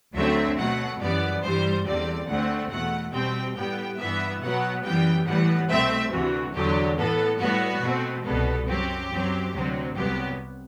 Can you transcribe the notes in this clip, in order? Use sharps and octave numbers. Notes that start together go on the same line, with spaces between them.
D2 D3 F#3 A3 C4 E5
B2 F#3 A3 F#5
F#2 E3 G3 B3 D5
G2 E3 G3 C5
E2 D3 G3 C4 D5
D2 D3 A3 C4 F#5
E2 B2 A3 F#5
B2 G3 C4 G5
A2 G3 B3 G5
G2 E3 B3 E5
B2 F#3 B3 F#5
F#2 E3 G3 B3 G5
A2 E3 G3 B3 F#5
C2 B2 A3 C4 E5
D2 C3 E3 F#4
E2 D3 F#3 G4
A2 E3 B3 A4
A2 G3 B3 F#4
B2 A3 C4
C2 B2 G3 B3 A4
F#2 F#3 C4 G4
F#2 F#3 C4
D2 C3 F#3 C4
C2 C3 F#3 B3 G4